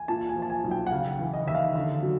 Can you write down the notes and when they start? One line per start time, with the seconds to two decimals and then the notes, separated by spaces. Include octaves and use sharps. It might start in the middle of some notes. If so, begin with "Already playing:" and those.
Already playing: G#5
0.08 A#2 A5
0.29 G#5
0.36 F3
0.42 A5
0.50 G#5
0.64 B1
0.71 G5
0.87 F#5
0.92 C#3 F5
1.19 E3
1.33 D#5
1.47 D#2 E5
1.55 F5
1.75 D3
2.03 F#3